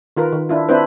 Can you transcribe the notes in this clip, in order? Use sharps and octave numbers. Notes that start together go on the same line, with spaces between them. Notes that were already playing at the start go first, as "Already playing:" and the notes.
D#3 F4 A#4 B4
D#3
D4 E4 F4
C4 D4 E4 B4 C5